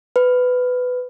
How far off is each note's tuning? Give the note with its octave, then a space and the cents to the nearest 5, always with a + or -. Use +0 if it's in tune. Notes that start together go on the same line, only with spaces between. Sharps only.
B4 +15